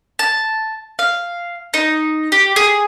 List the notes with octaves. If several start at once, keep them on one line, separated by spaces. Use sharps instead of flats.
A5
F5
D#4
G4
G#4